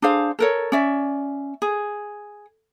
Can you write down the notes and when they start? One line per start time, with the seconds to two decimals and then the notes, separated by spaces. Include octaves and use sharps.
0.02 D4 G#4 C5 F5
0.39 A4 A#4 C#5
0.72 C#4 D5 E5
1.62 G#4